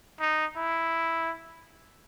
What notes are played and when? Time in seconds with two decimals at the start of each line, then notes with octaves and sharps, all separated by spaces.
0.20 D#4
0.56 E4